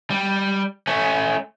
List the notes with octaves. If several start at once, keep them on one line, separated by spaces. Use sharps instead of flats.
G3
A3 C#4